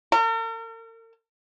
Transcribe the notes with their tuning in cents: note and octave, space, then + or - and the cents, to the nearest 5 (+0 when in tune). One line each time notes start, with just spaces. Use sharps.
A#4 -45